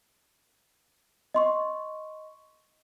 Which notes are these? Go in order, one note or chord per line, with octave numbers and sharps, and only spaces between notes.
D#5 C6 C#6